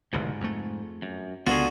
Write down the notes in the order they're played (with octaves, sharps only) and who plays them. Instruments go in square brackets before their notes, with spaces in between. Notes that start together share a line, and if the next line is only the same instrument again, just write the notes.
[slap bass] F1 D2 B2 [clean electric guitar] G#2
[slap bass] F2 A3
[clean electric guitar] F#2
[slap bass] C#2 B3 [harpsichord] D3 F#4 [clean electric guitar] F4 G#4